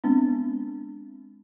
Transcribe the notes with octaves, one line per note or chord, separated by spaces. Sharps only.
G#3 B3 C4 D4